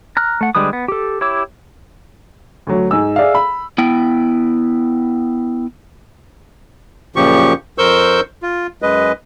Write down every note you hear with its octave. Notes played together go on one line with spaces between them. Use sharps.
A#5 F6 F#6
A3 F#5
D3 G3 G#3 B4 D#6
B3
G4 A4
E4 G4 C#5 D6 E6
D2 F#3
G#2 G#5 E6
G#4 D5 E5 F5
B5
B3 E4 G5
F#2 A#2 C#3 F3 G4 C#6
F2 A#4 C5 C#6 E6 G6
F4
F#2 G#3 B4 D#5